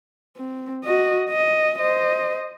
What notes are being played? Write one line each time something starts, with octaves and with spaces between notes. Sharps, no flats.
C4
F#4 D#5
D#5
C5 D#5